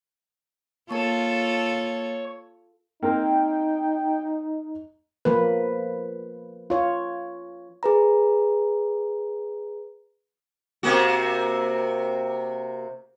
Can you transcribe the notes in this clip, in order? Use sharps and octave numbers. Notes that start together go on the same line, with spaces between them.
A#3 F4 A4 C#5 A5
A#3 C4 D#4 A#4 G5
F3 A#3 B4
F4 C#5
G#4 B4 A#5
C3 A#3 F#4